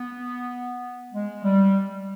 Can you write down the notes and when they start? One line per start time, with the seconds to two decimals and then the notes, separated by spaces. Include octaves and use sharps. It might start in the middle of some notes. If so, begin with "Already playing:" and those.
Already playing: B3
1.12 G#3
1.43 G3